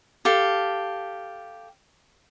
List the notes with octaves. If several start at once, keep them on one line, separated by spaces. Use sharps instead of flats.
G4 A4 F5